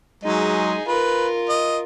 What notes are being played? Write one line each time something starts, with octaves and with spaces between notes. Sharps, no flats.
F#3 G#3 D#4 G#4
F4 A#4 B4
D#5